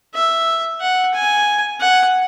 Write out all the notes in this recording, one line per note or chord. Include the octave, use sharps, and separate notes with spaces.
E5
F#5
G#5
F#5